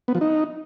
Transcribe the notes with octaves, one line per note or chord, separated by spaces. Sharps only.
B3
F3
D#4